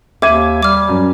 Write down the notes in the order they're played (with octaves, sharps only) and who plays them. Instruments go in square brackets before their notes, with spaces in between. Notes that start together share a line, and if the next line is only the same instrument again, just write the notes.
[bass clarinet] D#2 [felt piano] E5 G#6 D#7 [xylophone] D6
[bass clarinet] G3 [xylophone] D6 F6
[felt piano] F#2